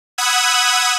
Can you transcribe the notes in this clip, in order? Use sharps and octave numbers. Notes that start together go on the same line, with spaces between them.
F#5 B5 D#6 E6 F#6 G#6